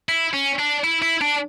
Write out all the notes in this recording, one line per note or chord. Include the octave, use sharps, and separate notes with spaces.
E4
C#4
D4
E4
E4
D4